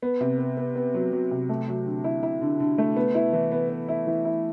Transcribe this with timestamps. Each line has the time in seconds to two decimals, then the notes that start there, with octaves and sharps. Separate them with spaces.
0.02 B3
0.20 C3
0.39 B3
0.57 B3
0.75 B3
0.94 F#3
1.12 F#3
1.31 C3
1.49 A3
1.68 F#3
1.86 D3
2.04 E4
2.23 E4
2.41 D3
2.60 D3
2.78 A3
2.96 B3
3.15 E4
3.33 E3
3.52 B3
3.70 B3
3.88 E4
4.07 E3
4.25 E4